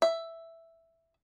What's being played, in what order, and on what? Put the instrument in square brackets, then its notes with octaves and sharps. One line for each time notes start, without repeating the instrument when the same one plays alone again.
[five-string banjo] E5